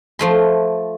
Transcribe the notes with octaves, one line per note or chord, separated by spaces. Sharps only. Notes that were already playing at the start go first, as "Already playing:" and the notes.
F3 A3 C6